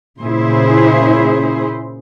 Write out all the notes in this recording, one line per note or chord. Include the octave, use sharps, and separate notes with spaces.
A#2 C#3 E4 G#4 C5